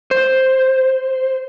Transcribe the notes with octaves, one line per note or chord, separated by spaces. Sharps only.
C5